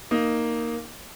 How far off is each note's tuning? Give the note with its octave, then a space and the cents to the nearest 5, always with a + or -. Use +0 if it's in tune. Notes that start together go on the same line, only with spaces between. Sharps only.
A#3 +0 D#4 +0